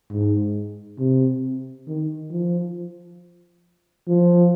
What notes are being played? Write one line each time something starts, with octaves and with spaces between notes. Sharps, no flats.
G#2
C3
D#3
F3
F3